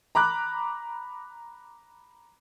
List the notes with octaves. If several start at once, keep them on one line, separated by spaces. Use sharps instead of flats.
A#5 B5 D6 F#6